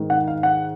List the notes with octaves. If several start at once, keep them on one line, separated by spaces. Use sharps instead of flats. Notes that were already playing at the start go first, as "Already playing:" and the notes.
Already playing: G#2 D#3
F#5
F5
F#5